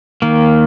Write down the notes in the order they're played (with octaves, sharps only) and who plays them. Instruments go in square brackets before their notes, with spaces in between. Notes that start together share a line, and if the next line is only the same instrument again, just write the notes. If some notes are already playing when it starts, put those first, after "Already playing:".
[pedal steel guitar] D#3 A#3